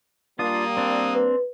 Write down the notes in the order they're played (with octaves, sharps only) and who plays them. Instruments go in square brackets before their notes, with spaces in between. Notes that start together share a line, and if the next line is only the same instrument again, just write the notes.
[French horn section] G3 A#3 [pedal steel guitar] D4 F4 [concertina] D#6
[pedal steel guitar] C4 D4
[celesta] B4